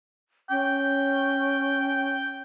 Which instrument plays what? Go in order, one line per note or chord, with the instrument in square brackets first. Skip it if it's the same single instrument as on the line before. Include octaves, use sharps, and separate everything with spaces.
[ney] C#4 [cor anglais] G5